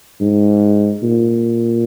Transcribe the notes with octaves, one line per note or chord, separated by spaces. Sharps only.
G#2
A#2